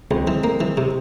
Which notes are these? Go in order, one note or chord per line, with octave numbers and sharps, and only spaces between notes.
C#2 G#3 C4
E3
A#3
E3
C3